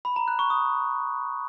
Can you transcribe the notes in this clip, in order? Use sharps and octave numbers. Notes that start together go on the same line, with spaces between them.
B5
A#5
F#6
C#6
D#6